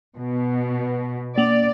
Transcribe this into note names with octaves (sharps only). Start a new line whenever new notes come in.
B2
A#3 D5 F7 F#7